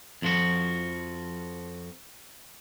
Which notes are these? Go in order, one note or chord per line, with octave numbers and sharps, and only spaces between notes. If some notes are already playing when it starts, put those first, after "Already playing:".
F2 F3 F#4